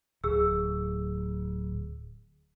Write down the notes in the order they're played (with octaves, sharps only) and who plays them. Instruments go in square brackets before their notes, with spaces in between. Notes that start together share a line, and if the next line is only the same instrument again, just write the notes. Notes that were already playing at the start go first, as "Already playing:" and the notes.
[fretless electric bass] D1 [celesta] G#4 E6